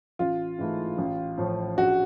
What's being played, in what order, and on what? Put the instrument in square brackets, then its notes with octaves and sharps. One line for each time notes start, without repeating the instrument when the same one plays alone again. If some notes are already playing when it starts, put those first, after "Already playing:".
[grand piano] A1 [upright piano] F4
[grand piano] G#2 E3 A3
A1
A2 F3
[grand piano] A#1 [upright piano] F#4